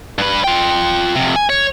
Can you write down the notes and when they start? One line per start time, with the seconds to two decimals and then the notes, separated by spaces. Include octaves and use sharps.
0.18 G2 B4
0.44 F4 G5
1.15 F2 C3
1.36 G#5
1.50 C#5